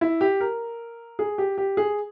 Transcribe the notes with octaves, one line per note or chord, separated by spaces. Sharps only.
E4
G4
A#4
G#4
G4
G4
G#4